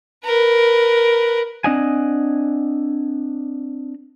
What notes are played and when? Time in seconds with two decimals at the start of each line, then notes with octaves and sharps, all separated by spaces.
0.25 A#4 B4
1.64 C4 D4 D5 D#5 F#5 G#5